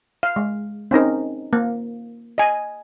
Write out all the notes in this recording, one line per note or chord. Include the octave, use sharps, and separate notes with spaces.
F5
G#3
C4 C#4 D#4 A#4
A#3
D#5 G#5